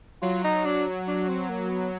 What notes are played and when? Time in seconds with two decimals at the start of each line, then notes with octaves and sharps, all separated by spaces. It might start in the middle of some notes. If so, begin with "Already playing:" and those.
0.22 F#3 F4
0.44 D#4
0.65 D4
1.08 D4
1.28 C4
1.49 A#3
1.70 B3